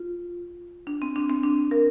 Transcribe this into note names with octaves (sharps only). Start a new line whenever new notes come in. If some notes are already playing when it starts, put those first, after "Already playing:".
Already playing: F4
D4
C4
D4
C4
D4
A#4